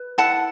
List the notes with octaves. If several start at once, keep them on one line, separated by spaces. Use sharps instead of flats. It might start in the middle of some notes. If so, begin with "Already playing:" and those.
Already playing: B4
E4 F#5 A5